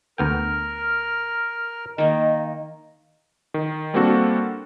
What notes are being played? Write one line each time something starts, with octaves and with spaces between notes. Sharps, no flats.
D2 B3 A#4 G5 F6
D#3 A#3 D#5
D#3
G3 A#3 C4 D4 F#4 A4